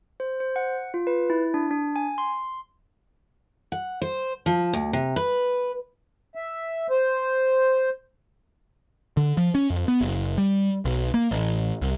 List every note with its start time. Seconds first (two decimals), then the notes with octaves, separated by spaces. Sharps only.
0.20 C5
0.40 C5
0.56 F#5
0.94 F4
1.07 B4
1.30 E4
1.54 D4
1.71 D4
1.96 G#5
2.18 C6
3.72 F#5
4.02 C5
4.46 F3
4.73 D2
4.93 C3
5.16 B4
6.35 E5
6.90 C5
9.17 D3
9.37 F3
9.55 C#4
9.70 F2
9.88 B3
10.01 F#1
10.38 G3
10.85 B1
11.14 A#3
11.31 A1
11.82 C2